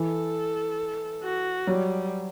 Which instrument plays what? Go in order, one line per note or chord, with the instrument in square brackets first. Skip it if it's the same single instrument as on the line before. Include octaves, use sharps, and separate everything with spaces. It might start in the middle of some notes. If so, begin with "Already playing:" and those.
Already playing: [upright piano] E3 [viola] A4
[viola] F#4
[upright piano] F#3 [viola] G3